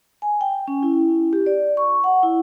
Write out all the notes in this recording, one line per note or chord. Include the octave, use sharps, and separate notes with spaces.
G#5
G5
C#4
E4
G4
D5
C#6
F#5
E4